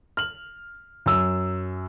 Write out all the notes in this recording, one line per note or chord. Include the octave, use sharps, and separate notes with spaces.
F6 F#7
F#2 E6